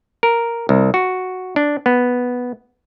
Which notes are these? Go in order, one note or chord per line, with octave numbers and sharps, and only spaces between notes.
A#4
C2
F#4
D4
B3